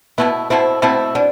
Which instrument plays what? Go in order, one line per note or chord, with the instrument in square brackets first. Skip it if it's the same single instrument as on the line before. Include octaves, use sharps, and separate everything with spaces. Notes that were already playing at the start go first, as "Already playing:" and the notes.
[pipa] B2 A3 E4 [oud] B3
[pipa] B2 A3 E4 [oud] C4
[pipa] B2 A3 E4 [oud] C4
[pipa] B2 [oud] D4